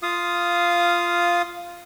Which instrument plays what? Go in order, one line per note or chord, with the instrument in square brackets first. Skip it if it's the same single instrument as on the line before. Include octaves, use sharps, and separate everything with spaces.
[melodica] F4 F5 D#6